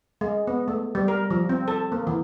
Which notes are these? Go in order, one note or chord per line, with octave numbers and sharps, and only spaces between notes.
G#3
B3
A3
G3
A#4
F3
C4
A4
A#3
E3